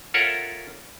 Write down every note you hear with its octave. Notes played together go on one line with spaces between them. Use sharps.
F4 A4 A#4 C#5 E5 F#5